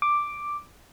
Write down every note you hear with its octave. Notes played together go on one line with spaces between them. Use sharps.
D6